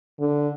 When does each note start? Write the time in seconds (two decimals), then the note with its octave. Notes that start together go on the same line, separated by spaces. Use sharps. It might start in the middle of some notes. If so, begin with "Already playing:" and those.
0.20 D3